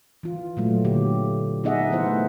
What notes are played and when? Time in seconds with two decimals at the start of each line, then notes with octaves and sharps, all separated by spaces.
0.23 E3 F4
0.57 A#2 F#3 A3
0.84 A#2 D3 G4
1.64 B3 D#4 G#4 D#5 E5 F#5
1.92 E3 B3 E4 C5 F#5
2.06 A3